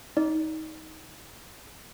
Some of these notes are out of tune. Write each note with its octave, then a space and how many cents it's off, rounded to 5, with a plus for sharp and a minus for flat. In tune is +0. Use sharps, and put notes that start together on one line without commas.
D#4 +20 D5 -20